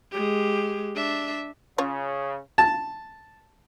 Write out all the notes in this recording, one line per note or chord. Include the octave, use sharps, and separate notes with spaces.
G#3 G4
D4 E5
C#3 C#4 F4 C#5
A5